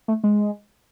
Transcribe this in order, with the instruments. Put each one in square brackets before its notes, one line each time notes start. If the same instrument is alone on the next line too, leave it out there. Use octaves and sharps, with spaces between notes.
[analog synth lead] A3
G#3